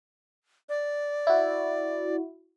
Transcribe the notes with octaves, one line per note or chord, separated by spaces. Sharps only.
D5
E4 F#4